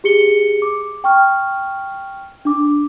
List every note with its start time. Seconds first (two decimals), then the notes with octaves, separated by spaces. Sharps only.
0.04 G4 G#4 C#7 G7
0.62 D6
1.04 G5 C#6 F6
2.45 D4 D6